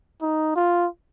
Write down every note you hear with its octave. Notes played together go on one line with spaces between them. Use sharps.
D#4
F4